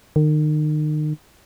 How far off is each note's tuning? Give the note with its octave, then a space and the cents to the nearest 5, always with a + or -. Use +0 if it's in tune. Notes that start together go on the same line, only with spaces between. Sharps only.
D#3 -35